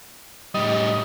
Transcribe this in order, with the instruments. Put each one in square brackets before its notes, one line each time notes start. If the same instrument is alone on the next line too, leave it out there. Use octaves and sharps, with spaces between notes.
[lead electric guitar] A2 G3 [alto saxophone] D#5